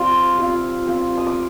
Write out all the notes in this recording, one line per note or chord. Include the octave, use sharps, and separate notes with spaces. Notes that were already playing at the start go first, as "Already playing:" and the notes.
Already playing: G3 C4 F4 C6
G3 C4 F4
G3 C4 F4
D#6
D6